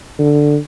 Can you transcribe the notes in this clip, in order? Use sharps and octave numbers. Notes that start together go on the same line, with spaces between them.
D3